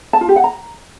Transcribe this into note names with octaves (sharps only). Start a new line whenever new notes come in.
A5
F4
G4
F#5
A#5